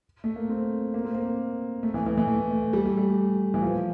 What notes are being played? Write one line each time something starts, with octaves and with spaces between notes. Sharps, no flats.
A3
A#3
C4
A#3
C4
A#3
A3
E3
E3
E3
A3
A3
G3
A3
G3
E3
F3